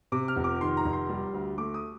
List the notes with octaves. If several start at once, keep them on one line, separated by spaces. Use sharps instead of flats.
C3 D6
F6
F1
D6
D#3 C6
A#5
F1
C6
G3
D2
A3 D6
D#6